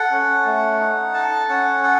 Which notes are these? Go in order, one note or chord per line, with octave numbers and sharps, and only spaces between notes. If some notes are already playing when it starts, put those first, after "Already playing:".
Already playing: A4 F#5
C#4
A3
D#4
A4 A5
C#4 F#5
A4 F#5